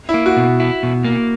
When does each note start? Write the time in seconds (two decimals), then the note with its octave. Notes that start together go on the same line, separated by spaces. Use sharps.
0.09 E4
0.14 A#3
0.26 F#4
0.37 B2
0.60 E4
0.83 B2
1.04 A#3